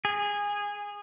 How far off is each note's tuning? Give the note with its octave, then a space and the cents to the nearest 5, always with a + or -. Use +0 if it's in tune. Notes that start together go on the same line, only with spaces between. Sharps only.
G#4 -15